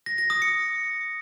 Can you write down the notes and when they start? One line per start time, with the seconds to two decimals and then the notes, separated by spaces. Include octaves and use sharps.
0.06 A#6
0.18 A#6
0.30 D#6
0.42 C#7